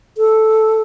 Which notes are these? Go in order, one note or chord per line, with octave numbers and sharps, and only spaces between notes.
A4